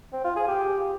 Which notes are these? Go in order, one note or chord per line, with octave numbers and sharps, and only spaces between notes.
C4
F4
G#4
G4